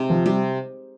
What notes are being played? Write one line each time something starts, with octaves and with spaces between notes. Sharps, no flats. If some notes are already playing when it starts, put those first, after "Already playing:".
Already playing: C3 G#3 D#4
F3
C3 G3